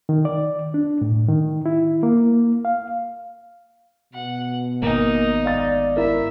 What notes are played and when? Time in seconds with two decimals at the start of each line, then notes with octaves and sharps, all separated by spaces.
0.09 D#3
0.25 D5
0.74 D4
1.01 A2
1.28 D#3
1.66 E4
2.03 A#3
2.65 F5
4.13 B2 F#5
4.82 G#1 A#3 B3 D#4
5.45 D5 F5 A6
5.97 E4 A#4 E5